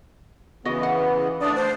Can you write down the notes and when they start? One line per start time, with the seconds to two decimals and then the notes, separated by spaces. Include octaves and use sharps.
0.65 C#3 E3 B3 F#4 D#5
0.83 F#5
1.41 A3 D4 D5 D#6
1.56 C5